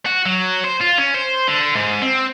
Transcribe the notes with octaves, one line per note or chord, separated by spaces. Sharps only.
F#4
F#3
C5
F4
C#4
C5
D3
G#2
C4